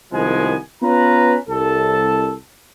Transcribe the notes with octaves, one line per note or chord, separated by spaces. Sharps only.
C2 D#3 F3 G#3 B3 G#5
B3 C#4 F4 B4 A#5
C2 A4 A5